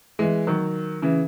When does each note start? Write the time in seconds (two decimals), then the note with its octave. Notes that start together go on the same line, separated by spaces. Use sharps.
0.19 E3 G#3
0.47 D#3 F#3
1.02 C#3 E3